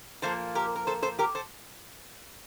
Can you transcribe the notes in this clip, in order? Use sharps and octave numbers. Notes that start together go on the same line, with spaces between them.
A#2 F3 A#3 A4 C5
G4 A#4
A#4
A4 C5
A4 C5
G4 A#4
A4 C5